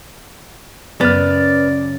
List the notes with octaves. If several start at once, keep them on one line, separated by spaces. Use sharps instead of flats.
F#2 C#3 B3 D5 F6 A6